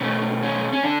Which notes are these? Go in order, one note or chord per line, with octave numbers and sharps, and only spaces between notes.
B2 A3 C#4
C#4
C#4
D3 D4